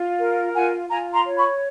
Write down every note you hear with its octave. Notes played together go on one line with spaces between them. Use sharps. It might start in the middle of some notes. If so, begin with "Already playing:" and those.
Already playing: F4
A#4
F4 F#5 G#5
F4 G#5 A#5
A#5 C6
C#5
B5 C#6